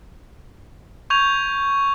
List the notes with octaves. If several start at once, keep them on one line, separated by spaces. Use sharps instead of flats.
C#6 G6 G#6 F7